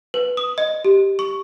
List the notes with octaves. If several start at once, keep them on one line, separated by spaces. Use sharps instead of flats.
B4
D#6
D#5
G4
C#6